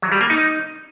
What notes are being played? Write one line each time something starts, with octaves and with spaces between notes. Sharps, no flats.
F#3
G3
A#3
D#4